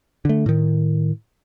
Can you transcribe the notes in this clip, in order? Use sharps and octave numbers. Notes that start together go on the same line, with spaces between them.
D3 A3
A2 D#3